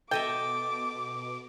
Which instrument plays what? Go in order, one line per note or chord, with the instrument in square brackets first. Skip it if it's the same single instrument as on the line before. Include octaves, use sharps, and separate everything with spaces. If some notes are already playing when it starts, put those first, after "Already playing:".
[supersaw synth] B2 [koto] A4 D#5 E5 [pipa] G5 [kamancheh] D6